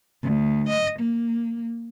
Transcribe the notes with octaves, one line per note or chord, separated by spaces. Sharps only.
D2
D#5
A#3